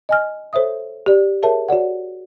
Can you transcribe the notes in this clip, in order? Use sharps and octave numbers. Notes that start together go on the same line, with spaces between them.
D#5 G#5 F6
A4 C5 C#5 E5 D#6
G4 D5
G#4 A#4 C#5 E5 A5
F#4 C#5 D5 F#5